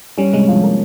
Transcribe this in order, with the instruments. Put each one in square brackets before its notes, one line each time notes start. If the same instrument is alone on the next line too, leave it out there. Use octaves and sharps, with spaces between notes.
[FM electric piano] G3 [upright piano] C#4
[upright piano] C3 [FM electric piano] G#3
[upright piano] F3
A#3